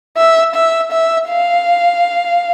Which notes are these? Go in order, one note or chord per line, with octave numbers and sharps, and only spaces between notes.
E5
E5
E5
F5